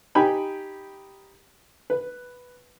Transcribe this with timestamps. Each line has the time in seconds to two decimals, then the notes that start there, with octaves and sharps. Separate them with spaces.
0.15 D#4 G4 G5 G#5 B5
1.90 B4